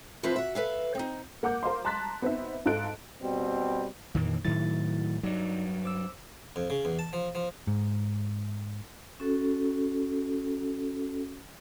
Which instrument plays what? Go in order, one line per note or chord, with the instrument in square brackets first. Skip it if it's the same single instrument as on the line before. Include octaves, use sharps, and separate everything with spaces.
[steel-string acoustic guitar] E3 F3 C4 E4 F4 B4
F#4 E5
A4 B4 E5 F5
C4 D#4
[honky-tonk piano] A#3 F#5 D6 G6
A#4 C5 F5 C6
A5 A#5 C6 F#6 A6 B6
B3 C4 D#4 E5
G#2 F4 A4 F#6 D7
[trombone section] B2 G3 C4
[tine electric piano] F2 A#2 [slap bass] D#3 E3 A#3
[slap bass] A2 F#3 [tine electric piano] D#3 E4 A6
[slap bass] G2 F#3 [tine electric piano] D#4 D5
[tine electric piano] C5 D6 E6
[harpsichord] F2
C#3
E2
A5
F3
F3
[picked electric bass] G#2
[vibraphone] C#4 F#4 A4